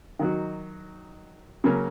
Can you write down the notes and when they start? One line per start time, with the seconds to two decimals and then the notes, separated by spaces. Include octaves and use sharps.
0.19 D#3 F#3 D#4 F#4
1.64 C#3 F#3 A#3 C#4